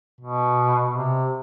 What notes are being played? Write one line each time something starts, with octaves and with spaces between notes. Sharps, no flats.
B2
C3